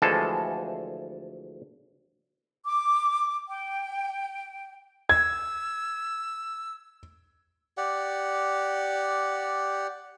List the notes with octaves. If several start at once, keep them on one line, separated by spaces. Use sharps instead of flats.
D2 E3 F3 G#3 G#4 A4
D6
G5
E6 G#6
G4 D5 F#5